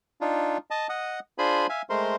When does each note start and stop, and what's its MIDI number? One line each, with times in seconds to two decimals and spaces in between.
0.21 0.57 62
0.21 0.57 63
0.21 0.57 65
0.71 0.87 75
0.71 0.87 81
0.89 1.20 75
0.89 1.20 78
0.89 1.20 87
1.38 1.67 62
1.38 1.67 65
1.38 1.67 68
1.38 1.67 72
1.38 1.67 80
1.38 1.67 83
1.69 1.82 76
1.69 1.82 77
1.69 1.82 80
1.90 2.16 56
1.90 2.16 57
1.90 2.16 70
1.90 2.16 72
1.90 2.16 84